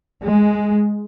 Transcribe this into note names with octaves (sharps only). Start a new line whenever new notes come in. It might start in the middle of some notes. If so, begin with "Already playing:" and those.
G#3